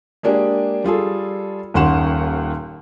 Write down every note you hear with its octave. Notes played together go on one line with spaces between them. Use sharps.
G#3 A#3 D4 G4 G#4
G3 F4 G#4 A4
D#1 D#2 C#4 F#5 C6 E7